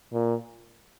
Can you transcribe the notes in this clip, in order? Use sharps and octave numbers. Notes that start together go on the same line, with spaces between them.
A#2